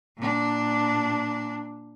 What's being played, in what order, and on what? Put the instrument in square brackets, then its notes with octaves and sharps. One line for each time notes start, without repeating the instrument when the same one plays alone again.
[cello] A#2 D4